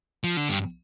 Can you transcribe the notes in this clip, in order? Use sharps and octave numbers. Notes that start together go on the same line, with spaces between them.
F3
D3
G2